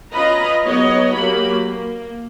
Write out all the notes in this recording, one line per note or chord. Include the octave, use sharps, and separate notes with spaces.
C#4 F4 B4 D#5 A#5 B5
F#3 B3 D#4 G#4 C#5 D#5
F#3 A#3 G4 B5
A#3